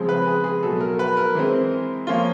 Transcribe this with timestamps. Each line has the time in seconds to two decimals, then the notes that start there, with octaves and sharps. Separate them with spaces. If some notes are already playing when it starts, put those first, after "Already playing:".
Already playing: C#3 F3 G#3 C4
0.09 B4
0.27 G#4
0.44 G#4
0.63 B2 F#3 A3 A4
0.81 A#4
0.99 B4
1.17 A#4
1.35 E3 G#3 C4
2.07 F3 A#3 C#4 F4